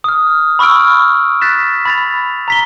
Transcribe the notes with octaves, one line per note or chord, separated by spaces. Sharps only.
D#6 F6
B5 C#6 E6 F6 D7
F#6 A6 B6 E7
B5 A6 F7
A#5 B6 G7